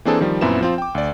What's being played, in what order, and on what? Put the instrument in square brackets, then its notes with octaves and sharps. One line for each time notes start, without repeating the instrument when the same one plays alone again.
[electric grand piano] E3 A#3 C4 D4 G#4 A4
D#3 F3 G3
F#2 A#2 B3 C4 E4 E7
F3 C4 F4
G5 D6
D2 D5